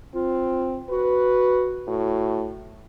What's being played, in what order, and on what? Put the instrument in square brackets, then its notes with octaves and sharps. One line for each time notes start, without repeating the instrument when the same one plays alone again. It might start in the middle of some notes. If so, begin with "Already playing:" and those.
[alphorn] C4 [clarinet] F4
[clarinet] F#4 [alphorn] B4
[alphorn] A2 [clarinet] F#4